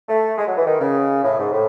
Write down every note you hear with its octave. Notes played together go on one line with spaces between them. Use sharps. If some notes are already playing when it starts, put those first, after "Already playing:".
A3
G#3
F#3
E3
D#3
C#3
A2
G#2
A2